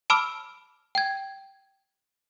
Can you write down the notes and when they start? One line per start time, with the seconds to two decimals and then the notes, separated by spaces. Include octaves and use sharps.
0.10 A5 B5 D6 E6 F6
0.95 G5 G#6